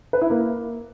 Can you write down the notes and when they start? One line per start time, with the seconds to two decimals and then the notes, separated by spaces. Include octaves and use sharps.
0.13 B4
0.22 E4
0.30 A#3